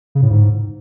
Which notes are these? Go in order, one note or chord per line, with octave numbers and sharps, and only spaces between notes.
C#3
A2
G#2